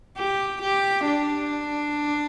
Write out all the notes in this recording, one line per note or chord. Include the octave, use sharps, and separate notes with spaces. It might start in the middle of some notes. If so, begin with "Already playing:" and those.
G4
G4
D4